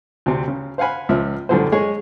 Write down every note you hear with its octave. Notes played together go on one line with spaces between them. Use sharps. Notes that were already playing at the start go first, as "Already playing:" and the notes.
D2 C3
C#3
C5 F5 F#5 G#5 B5
C#2 F3 E5
C2 F#2 A2 D3 F3 C5
G#3 G#4 C#5